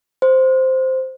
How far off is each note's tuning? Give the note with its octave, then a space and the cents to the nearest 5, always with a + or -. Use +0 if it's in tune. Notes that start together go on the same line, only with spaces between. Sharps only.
C5 -5